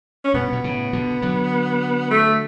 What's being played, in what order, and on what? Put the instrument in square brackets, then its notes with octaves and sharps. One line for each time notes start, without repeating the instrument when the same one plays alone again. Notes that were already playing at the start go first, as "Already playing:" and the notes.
[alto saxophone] C#4
[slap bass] G2 B2 [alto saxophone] B3
[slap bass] B2
A2 C#3
B2 D3
D3 F#3
[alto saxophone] A3